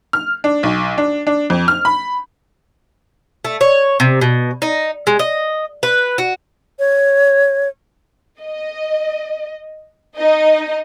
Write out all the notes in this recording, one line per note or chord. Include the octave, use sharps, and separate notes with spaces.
F6
D4
B1
D4
D4
F2
F6
B5
A3
C#5
C3
B2
D#4
G#3
D#5
B4
F#4
C#5
D#5
D#4 D#5